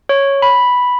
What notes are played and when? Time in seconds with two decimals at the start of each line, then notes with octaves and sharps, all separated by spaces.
0.09 C#5
0.42 B5